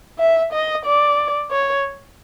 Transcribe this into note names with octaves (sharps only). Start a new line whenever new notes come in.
E5
D#5
D5
C#5